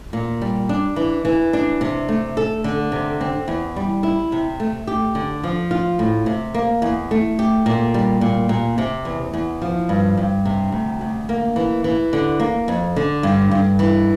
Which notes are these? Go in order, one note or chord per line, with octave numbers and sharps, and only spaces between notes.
A#2
G3
D4
E3
E3
D4
C3
A3
A4
D3
C3
C4
E2
G3
E4
C3
A3
G4
D3
F3
F4
A2
C3
A#3
E2
A3
G4
A#2
G3
A#2
A#2
C3
E2
E2
F3
G2
G2
C3
D2
D2
A#3
E3
E3
D3
A#3
F2
D3
G2
G2
E3